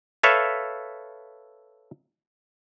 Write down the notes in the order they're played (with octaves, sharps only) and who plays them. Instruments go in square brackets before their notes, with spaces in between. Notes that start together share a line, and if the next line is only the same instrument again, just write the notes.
[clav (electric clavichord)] A4 B4 C#5 E5 F5